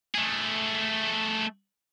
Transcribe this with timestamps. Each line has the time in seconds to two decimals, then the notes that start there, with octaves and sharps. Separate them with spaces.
0.15 A3 G#4